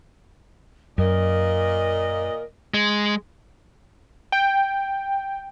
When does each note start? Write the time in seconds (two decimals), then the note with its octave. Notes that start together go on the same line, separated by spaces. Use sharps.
0.98 F#2 A#2 A#4 D#5
2.74 G#3
4.32 G5